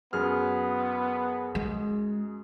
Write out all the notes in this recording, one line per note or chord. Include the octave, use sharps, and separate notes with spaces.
F#2 B3 G#4 F6
G#3